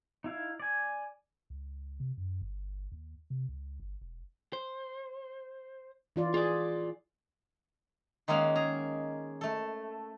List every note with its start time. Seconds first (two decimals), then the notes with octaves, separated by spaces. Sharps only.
0.24 D#4 E4 F5
0.60 D5 G#5
1.50 C#2
2.00 C3
2.17 F#2
2.42 G1
2.92 D#2
3.30 C3
3.49 C#2
3.80 G1
4.01 E1
4.53 C5
6.16 E3 F4 D5
6.34 F4 G#4 D5
8.28 D#3 G#3 A#3 C#4 F5 F#5
8.55 G#4 A#5
9.41 A3 A4